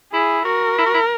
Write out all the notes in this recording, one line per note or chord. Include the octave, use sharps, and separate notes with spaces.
E4 G#4
F#4 A#4
E4
F#4
E4